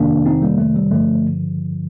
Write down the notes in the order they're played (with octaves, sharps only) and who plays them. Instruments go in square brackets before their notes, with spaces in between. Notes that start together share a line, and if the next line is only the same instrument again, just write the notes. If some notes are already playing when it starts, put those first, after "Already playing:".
Already playing: [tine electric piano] F2 C3 D#3 A#3 D4
C4 D#4
G3 A#3
A3
G3
G2 D3 F3 A3